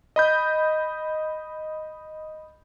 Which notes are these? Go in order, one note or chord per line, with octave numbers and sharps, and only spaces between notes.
D#5 B5 G6